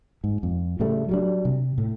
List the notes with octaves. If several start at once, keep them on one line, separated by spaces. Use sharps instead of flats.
G#2
F2
A2 C#3 G3 A3
F#3 G3 D4
C3
A2